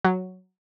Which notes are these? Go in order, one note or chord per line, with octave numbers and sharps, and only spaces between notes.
F#3